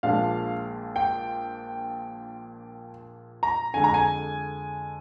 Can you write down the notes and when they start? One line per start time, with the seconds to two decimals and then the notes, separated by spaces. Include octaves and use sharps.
0.03 A#1 A#2 F3 G#3 D4 F5
0.96 G5
3.43 A#5
3.73 F2 D3 G#3 G#5
3.84 A#5
3.94 G#5